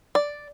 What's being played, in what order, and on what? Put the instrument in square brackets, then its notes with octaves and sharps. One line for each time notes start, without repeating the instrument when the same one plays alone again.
[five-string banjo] D5